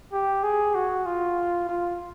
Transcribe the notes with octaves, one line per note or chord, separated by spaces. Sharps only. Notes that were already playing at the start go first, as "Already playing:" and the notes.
G4
G#4
F#4
F4
F4